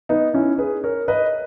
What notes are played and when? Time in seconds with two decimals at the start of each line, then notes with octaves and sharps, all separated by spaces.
0.09 B3 D#4
0.34 C#4 E4
0.58 G#4 B4
0.84 A#4 C#5
1.08 B4 D#5